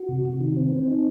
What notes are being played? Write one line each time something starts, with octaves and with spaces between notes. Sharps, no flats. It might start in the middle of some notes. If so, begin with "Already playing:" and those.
Already playing: F#4
C3
C3
D#3
C4
C4
D#4